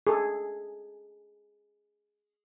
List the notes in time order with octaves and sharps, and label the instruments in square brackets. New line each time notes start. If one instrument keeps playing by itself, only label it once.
[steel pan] G#4 A4